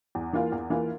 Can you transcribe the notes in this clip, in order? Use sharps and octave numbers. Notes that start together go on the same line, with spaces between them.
E2
E3 A#3 F4
E2
E3 A#3 F4